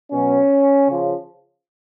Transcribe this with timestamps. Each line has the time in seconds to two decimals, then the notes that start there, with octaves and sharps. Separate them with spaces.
0.11 B2 F#3 C#4
0.88 C#3 F3